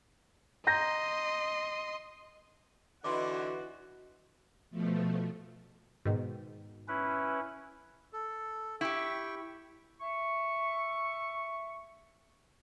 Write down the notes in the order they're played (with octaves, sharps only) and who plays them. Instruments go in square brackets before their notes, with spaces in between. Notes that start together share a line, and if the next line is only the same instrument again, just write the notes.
[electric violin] D#5 C6 [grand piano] A#5 G6 A#6
[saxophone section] D3 E3 [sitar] D#4 E4 [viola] F#4 [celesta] C6 D6
[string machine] B2 F3 A3
[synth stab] G#2 B2 D#3
[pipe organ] C#4 E4 B4
[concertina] A4
[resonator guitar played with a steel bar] E4 G4 [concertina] G5 C#6
[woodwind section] E5 C#6